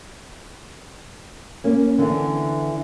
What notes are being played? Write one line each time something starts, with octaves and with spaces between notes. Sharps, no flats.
A#3 C#4
D3 E3 B3